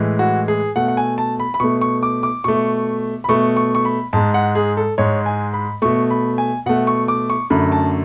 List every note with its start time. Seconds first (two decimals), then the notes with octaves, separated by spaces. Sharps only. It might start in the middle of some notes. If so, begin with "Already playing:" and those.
Already playing: A2 E3 G#3
0.19 F#4
0.48 G#4
0.76 B2 A3 F#5
0.88 F#5
0.97 G#5
1.18 A5
1.40 B5
1.54 B5
1.60 B2 A3 C#6
1.81 C#6
2.03 D6
2.23 D6
2.44 B2 A3 C#6
3.24 B5
3.28 B2 A3 C#6
3.57 C#6
3.75 C#6
3.85 B5
4.13 G#2 G#3 A5
4.34 F#5
4.55 G#4
4.77 A4
4.98 G#2 G#3 C#5
5.26 G#5
5.54 B5
5.82 B2 A3 C#6
6.10 B5
6.38 G#5
6.66 B2 A3 F#5
6.87 C#6
7.08 D6
7.30 C#6
7.50 F#2 D3 A3 B5
7.72 A5